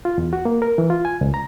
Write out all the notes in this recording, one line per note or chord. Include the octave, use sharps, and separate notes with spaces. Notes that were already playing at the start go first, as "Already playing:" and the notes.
F4
E2
F#4
A#3
A#4
E3
F4
G#5
C#2
A#5